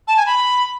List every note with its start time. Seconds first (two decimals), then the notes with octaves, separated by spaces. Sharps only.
0.07 A5
0.16 G#5
0.26 B5